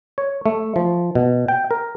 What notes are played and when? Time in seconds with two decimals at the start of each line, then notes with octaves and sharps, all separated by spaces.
0.18 C#5
0.46 A3
0.76 F3
1.15 B2
1.48 G5
1.71 A#4